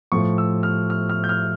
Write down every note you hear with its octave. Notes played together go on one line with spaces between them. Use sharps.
A2 F3 C#6
E6
F6
F6
F6
G6
F6